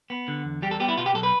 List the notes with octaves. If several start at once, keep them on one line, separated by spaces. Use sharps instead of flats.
B3
D3
E2
G3 G4
A4
B3 G4
E4
B2 F4
G4
B1 A4
B4